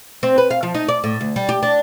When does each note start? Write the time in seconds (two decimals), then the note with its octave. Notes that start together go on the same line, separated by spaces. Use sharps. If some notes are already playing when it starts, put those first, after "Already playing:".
0.23 C4
0.38 B4
0.51 F5
0.63 F3
0.75 D#4
0.89 D5
1.04 A2
1.21 D2
1.36 G3
1.49 G4
1.63 D4